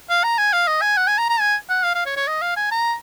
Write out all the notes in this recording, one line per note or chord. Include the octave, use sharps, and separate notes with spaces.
F5
A#5
G#5
F5
D#5
G#5
F#5
G#5
A#5
A#5
G#5
F#5
F5
F5
C#5
C#5
D#5
F5
G#5
A#5